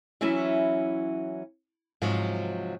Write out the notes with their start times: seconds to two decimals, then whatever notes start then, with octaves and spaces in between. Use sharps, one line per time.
0.21 E3 F#3 C#4 E4 E5
2.02 G#2 C3 F3 F#3